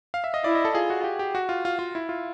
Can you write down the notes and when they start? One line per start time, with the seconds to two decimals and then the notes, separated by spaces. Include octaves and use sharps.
0.14 F5
0.24 E5
0.34 D#5
0.44 E4 D5
0.55 D#5
0.65 A4
0.75 F4 G#4
0.90 F#4
1.04 G4
1.19 G4
1.35 F#4
1.49 F4
1.65 F4
1.79 F4
1.95 E4
2.09 F4